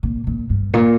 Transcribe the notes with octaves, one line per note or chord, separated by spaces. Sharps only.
A#2
A#2
G2
A#2